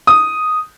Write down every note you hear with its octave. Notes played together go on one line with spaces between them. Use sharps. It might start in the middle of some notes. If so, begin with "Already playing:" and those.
D#6